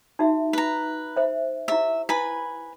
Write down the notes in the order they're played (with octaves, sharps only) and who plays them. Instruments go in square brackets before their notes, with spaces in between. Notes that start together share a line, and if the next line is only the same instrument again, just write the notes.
[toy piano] D#4 F#4 E5
[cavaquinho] B4 A#5
[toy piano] C5 E5
[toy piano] E4 G4 [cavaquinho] E5
[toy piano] E4 [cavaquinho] B4 G#5 B5